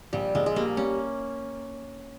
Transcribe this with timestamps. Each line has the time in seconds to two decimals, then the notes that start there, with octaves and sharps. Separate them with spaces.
0.13 A#1 G3
0.35 A#1 G#3
0.46 G#3
0.56 G3 A#3
0.77 G3 C#4